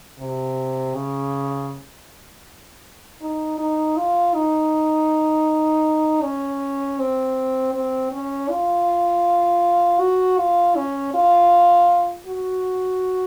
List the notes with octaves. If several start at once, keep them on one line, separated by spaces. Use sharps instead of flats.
C3
C#3
D#4
D#4
F4
D#4
C#4
C4
C4
C#4
F4
F#4
F4
C#4
F4
F#4